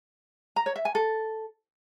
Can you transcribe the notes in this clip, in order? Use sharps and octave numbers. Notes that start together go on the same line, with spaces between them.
A#5
C#5
E5
G#5
A4